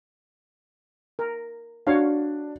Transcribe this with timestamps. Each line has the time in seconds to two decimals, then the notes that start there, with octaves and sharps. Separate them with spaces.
1.19 A#4
1.87 D4 F#4 C#5 F5